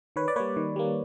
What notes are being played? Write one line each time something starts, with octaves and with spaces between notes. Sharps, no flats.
D#3 B4 C#5
D5
G3 A#3 B4 C#5
D#3
G3 A#3